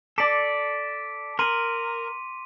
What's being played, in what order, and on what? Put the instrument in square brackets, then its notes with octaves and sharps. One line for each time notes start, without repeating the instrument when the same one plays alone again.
[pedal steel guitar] A4 D5 [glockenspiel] D6 B6 D7
[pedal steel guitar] A#4 [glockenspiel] C6 D#7